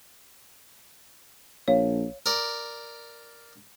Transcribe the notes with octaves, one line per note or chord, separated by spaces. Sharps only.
A#1 C#5 F5
A#4 D5